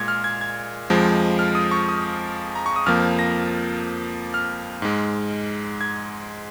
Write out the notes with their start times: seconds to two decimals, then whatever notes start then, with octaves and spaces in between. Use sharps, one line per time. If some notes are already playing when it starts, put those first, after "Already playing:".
Already playing: A#2 G#3 G#6
0.08 F6
0.24 G#6
0.41 G#6
0.90 F2 F3 G#3
1.39 F6
1.55 D#6
1.71 C#6
1.89 D#6
2.55 A#5
2.66 C#6
2.76 D#6
2.86 F2 F3 A#3 F6
3.19 A#6
4.34 F6
4.82 G#2 G#3
5.81 G#6